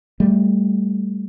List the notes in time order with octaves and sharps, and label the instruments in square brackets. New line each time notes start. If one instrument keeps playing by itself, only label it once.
[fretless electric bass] G3 A3